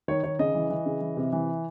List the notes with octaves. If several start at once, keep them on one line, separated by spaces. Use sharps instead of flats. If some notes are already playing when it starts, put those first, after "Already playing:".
D#3 C#5
D#3 C#5
C#3 D#5
E3
E3
C#3
E3
C3
E3